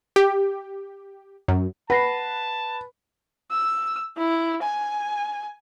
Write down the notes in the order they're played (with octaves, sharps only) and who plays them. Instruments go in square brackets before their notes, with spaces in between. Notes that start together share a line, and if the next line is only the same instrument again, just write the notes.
[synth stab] G4
F#2
[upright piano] B4 [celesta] F#5 A#6 C7 [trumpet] A5 [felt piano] B5
[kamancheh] E6
E4
G#5